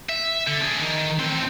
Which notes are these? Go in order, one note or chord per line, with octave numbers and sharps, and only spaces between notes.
E5
D3
D4 G#4
D#3
A2 C4